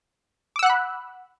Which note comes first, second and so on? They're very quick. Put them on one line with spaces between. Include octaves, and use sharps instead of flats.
D6 E6 F#5 F#6 B5